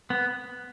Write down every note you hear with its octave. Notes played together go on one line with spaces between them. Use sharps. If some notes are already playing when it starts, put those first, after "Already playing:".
B3